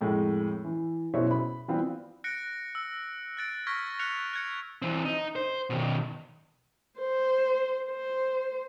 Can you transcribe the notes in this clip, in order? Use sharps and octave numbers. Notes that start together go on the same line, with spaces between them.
F2 A2 G#3
E3
F#1 B2 E4 C5 C#5 E5
B5
E3 G3 B3 C4 F4
F#6 A#6 C#7 D7
E6
F#6 A6 D7
C#6 F6 G#6 A#6 B6
F6 F#6 C#7 F7
F#6 G#6 C#7
E3 C4
D#4
C5
B2 D#3
C5
C5